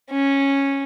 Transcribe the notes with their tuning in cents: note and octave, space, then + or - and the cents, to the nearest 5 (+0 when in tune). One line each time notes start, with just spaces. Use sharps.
C#4 -10